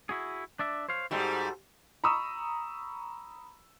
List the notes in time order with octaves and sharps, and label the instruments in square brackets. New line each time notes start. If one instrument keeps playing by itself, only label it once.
[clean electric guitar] E4 F#4 G#4
D4 D5 E5
C5 C#5 F5
[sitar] G#2 G3 [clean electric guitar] F#4 A4 C5
[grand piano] A#5 B5 C#6 D#6 E6